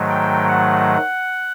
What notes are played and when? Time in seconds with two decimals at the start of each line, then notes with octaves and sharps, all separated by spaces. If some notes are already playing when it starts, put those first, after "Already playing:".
Already playing: G#2 D#3 F#3 A3
0.10 G5
0.49 F#5